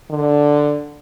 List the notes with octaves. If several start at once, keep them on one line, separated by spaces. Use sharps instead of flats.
D3